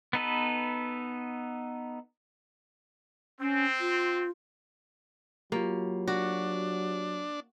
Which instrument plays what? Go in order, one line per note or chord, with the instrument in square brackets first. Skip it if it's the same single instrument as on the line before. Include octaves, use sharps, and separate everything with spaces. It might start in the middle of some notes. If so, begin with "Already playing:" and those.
[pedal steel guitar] B3 D#4 A4 B4
[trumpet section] C4 [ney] C#4
[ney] F4
[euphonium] F#3 [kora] A#3 [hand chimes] F4 G4
[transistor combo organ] D4 [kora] F#4